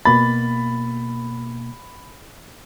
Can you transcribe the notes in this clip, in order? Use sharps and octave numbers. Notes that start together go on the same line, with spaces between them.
B2 A#3 B5 A6